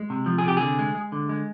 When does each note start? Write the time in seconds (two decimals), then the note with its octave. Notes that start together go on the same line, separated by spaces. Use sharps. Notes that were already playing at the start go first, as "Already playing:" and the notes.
Already playing: G#3
0.10 C3
0.26 F3
0.38 G#4
0.44 C3 G4
0.57 D3 G#4
0.78 G#3
0.95 G#3
1.12 D3
1.29 G#3